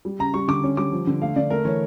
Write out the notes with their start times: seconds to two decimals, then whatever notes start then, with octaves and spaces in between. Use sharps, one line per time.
0.05 G3
0.19 C#3 A#5
0.34 G3 C#6
0.48 D3 D6
0.64 C#4
0.77 G3 D6
0.92 F3
1.07 D3
1.21 A3 F5
1.36 D3 D5
1.50 A3 A#4
1.65 E3 C#5